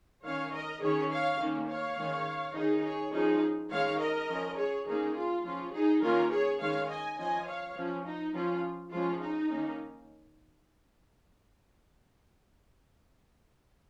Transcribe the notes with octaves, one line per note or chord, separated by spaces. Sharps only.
D#3 C#4 C#5 F5
A#4 D#5
D#3 C#4 G#4 C#5
C#5 F5
D#3 A#3 C#4
C#5 F5
D#3 G#3 C#4
D#3 C#4 D#4 G#4
G#4 C#5
F3 G#3 C#4 D#4 G#4
D#3 G#3 C#4 C#5 F5
A#4 D#5
F3 C#4
G#4 C#5
D#3 A#3 C#4 D#4 G#4
F4
F3 C#4 F4
D#4 G#4
D#3 A#3 C#4 F4 A#4
G#4 C#5
D#3 G#3 C#4 C#5 F5
D#5 G#5
F3 C#4 D#5 G#5
C#5 F5
F3 C#4
D#4
F3 C#4 F4
F3 G#3 C#4 F4
D#4
D#3 A#3 C#4